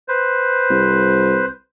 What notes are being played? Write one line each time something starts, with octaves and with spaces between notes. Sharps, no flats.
B4 C5
C2